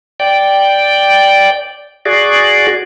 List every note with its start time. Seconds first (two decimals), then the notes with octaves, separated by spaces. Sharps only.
0.20 D5 G5
2.05 F#4 G#4 D5